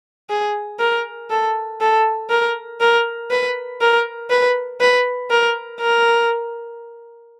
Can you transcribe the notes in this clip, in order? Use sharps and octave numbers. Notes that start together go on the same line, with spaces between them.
G#4
A#4
A4
A4
A#4
A#4
B4
A#4
B4
B4
A#4
A#4